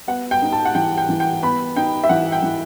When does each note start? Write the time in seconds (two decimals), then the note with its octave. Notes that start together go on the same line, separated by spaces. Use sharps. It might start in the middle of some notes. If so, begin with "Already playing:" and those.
0.08 B3 F#5
0.31 G5
0.42 D#4
0.52 A5
0.65 F#5
0.75 E3 G5
0.97 G5
1.09 E3
1.20 G5
1.42 B3 B5
1.76 D#4 G5
2.04 E5
2.09 E3 F#5
2.32 G5
2.43 E3